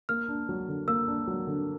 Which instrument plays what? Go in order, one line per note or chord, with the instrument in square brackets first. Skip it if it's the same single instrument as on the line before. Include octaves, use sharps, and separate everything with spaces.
[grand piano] A#3 [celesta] F6
[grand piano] D4
F#3
D3
[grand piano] A#3 [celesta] E6
[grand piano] D4
F#3
D3